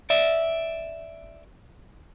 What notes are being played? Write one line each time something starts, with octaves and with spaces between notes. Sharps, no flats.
D5 E5